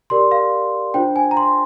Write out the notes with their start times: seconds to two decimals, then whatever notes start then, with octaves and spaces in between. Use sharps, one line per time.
0.10 G4 A#4 D5 C6
0.31 F5
0.94 D4 F4 C5 G5
1.16 G#5
1.31 A#5
1.37 C6